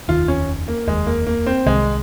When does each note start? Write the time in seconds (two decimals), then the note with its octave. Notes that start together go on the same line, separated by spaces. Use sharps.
0.08 F1 D#2 D#3 F4
0.28 C#4
0.68 A#3
0.87 F1 D#2 D#3 G#3
1.07 A#3
1.27 A#3
1.47 C4
1.66 C2 C3 D#3 G#3